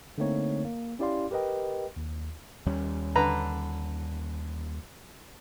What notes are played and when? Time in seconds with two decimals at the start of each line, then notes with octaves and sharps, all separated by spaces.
0.18 D3 A3 A#3 C4 D#4 C#5
0.65 A#3
0.99 C#4 E4 G4 D5 F5 C6
1.31 G4 A#4 B4 D#5 G5
1.97 D#2
2.66 D#2 G3 C#4
3.16 D3 B4 A#5